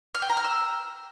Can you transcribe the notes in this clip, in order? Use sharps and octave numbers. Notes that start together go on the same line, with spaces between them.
F6
G5
A#5
F6
E6